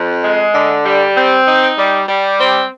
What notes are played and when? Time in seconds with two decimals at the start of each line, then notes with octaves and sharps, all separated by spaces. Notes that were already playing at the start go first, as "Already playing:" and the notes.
Already playing: F2
0.24 G#3
0.55 D3
0.85 G3
1.16 C4
1.48 D#4
1.77 G3
2.08 G3
2.40 C4